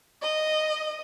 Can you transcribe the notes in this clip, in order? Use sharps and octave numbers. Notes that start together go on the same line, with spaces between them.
D#5